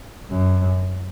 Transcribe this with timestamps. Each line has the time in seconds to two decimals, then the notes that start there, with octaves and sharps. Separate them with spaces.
0.31 F#2